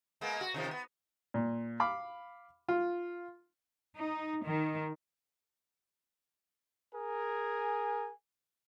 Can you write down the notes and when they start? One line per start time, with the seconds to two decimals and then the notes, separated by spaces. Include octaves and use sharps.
0.21 G#3 A#3 B3
0.41 F#4
0.54 C3 D#3 F3
0.71 B3
1.34 A#2
1.80 F5 B5 D6
2.69 F4
3.97 D#4
4.45 D#3
6.95 G#4 A#4 G#5